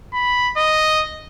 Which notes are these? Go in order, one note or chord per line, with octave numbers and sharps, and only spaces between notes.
B5
D#5